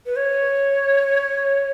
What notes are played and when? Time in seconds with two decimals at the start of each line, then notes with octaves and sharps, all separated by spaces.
0.06 B4
0.16 C#5